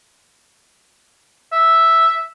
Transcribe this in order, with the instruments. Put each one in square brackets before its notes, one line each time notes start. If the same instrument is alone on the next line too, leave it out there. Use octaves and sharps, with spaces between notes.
[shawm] E5